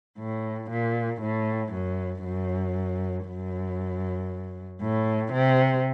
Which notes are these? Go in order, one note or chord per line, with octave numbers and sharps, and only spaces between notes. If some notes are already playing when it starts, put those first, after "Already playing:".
A2
A#2
A2
F#2
F#2
F#2
A2
C3